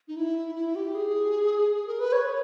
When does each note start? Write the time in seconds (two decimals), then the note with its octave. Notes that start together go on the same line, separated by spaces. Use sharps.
0.08 D#4
0.16 E4
0.55 E4
0.75 G4
0.95 G#4
1.74 G#4
1.87 A#4
2.00 B4
2.13 C#5